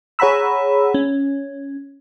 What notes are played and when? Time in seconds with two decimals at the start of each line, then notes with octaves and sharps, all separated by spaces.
0.19 G#4 C#5 F#5 A#5 B5 E6
0.94 C#4